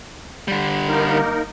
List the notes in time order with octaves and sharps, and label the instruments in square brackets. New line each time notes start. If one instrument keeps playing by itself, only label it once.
[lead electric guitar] D3 G3
[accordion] A#3 D#4 A#4